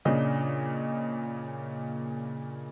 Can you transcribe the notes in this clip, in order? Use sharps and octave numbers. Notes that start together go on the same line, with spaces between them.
A#2 C#3 D4 D#5